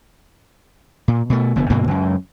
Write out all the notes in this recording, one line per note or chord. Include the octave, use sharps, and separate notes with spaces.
A#2
B2 A3
F1 D3 B3
G2 B2 D3 A#3
C#2 F#2